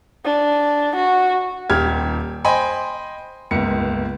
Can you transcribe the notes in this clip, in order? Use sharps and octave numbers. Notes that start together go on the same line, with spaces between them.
D4
F#4
D#1 G4 F6 G#6
C5 D#5 G5 G#5 B5 C6
G1 C#2 A#3 C#7